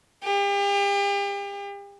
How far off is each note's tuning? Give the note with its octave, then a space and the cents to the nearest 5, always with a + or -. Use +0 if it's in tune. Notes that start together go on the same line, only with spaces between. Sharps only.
G4 +40